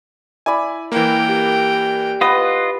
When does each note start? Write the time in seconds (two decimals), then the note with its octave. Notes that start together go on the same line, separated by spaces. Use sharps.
0.46 E4 D5 G#5 B5
0.92 E3 A#3 A#4 G5
1.28 G4
2.21 B3 F4 B4 D#5